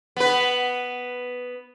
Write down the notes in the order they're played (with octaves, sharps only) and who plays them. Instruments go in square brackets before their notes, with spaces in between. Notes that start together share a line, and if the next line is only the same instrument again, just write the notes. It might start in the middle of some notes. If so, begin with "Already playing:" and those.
[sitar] B3 B4